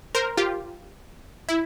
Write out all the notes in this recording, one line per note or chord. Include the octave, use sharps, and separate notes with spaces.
A#4 C5
F4 G4
E4